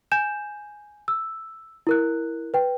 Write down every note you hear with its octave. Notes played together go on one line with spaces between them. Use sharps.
G#5 G6 E7
E6
E4 A#4 F#6
B4 G5